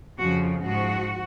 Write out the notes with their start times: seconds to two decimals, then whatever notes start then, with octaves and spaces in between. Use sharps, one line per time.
0.18 F2 C#3 F3 F#4
0.64 G#2 F3 F#4